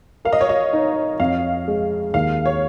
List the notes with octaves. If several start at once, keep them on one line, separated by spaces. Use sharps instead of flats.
A#4 F5
D#5
C#5
D#5
D#4
F2 F5
G#3
D#2 F5
C#5